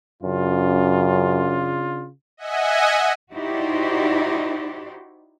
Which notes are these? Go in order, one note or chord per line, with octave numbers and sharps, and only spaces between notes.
F#2 C#3 D4 F4
D#5 E5 F#5 G#5
D#4 E4 F#4 G4 C5 D5